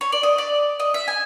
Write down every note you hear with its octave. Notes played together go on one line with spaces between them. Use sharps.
C#5
D5
D#5
D5
D#5
E5
G#5